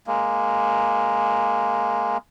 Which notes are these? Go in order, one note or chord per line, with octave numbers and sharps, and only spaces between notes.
G#3 A#3